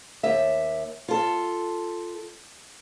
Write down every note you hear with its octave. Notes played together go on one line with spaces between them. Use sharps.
D#2 E5
F4 A4